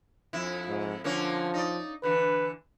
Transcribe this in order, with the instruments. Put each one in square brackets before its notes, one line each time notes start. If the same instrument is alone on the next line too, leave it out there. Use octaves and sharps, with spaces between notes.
[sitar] F2 E4
[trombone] G#2
[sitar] D3 A#3 C#4 [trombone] F3
[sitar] D#4 D5
[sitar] D3 E3 [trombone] B4